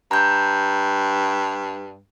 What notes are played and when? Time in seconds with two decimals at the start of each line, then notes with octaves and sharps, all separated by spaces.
0.11 G2 A#5 G6